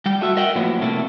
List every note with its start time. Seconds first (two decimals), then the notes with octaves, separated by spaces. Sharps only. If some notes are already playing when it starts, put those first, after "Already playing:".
0.06 G3 G5
0.21 A3 F#4 E5
0.37 A#4 D#5 E5 F#5 G5
0.55 A2 F3 F#3 A#3 B3 E4
0.81 A2 C3 A3 A#3